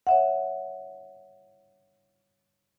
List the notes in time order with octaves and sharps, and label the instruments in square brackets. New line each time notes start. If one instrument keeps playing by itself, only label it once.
[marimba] C#5 E5 F#5